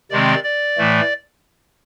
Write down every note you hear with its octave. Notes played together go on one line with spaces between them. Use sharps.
C3 D#3 G#3 C4 D5
D5
A2 E3 A3